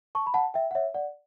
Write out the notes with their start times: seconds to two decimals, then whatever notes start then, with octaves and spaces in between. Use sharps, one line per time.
0.15 A5 C#6
0.27 B5
0.34 F#5 A5
0.54 E5 G5
0.71 F#5
0.75 C#5 E5
0.94 D5 F#5